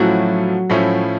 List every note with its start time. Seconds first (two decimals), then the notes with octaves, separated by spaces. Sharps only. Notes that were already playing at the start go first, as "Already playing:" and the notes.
Already playing: A2 F3 F#3 A3 C#4 E4 F#4
0.70 A2 F3 A3 C#4 E4